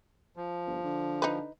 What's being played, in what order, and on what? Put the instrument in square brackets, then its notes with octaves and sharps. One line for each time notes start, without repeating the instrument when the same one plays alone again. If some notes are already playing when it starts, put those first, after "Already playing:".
[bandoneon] F3
[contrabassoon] G1
D3
[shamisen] D#4 B4